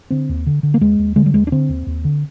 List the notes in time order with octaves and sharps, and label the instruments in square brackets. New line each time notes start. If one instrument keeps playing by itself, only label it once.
[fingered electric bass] D3 C4
D#2
D3
D3
A#3
D#2 G#3
D#2
D3 G#3
G3
D#2 G#3
D4
D3 C4
D#2
D#2
D3